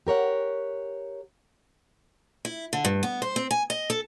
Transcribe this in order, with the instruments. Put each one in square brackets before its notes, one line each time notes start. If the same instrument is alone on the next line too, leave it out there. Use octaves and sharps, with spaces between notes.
[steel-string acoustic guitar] G4 A#4 C#5 F#5
E4
D3
G2
B3
C5
C4
G#5
D#5
A4